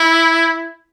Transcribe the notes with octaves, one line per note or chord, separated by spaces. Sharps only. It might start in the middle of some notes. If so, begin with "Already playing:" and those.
Already playing: E4